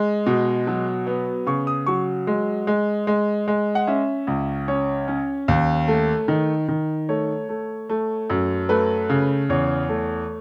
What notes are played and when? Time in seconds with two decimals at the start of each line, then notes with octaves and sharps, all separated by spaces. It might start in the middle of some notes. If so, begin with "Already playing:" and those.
Already playing: G#3
0.26 B2
0.67 F#3
1.07 B3
1.47 C#3 C#6
1.67 D#6
1.87 F#3 C#6
2.27 G#3
2.67 G#3
3.07 G#3
3.48 G#3
3.75 F#5
3.87 C#4 E5
4.27 C#2
4.68 C#4 C#5
5.08 C#4
5.48 D#2
5.88 A3
6.28 D#3
6.68 D#3
7.09 A3 C#5
7.49 A3
7.90 A3
8.30 F#2
8.69 A3 B4
9.09 C#3
9.49 E2 C#5
9.89 A3